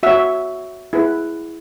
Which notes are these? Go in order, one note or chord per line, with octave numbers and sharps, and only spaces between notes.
F#4 C#5 E5
E4 G#4 B4